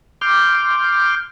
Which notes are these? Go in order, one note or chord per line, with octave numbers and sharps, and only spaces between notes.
C6 D6 F6 G6